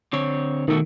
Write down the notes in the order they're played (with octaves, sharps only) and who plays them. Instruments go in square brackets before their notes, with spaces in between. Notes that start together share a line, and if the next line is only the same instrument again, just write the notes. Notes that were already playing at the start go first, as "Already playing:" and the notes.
[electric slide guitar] D3 C4 C#5
[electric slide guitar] B2 A3 F#4 [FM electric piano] D#3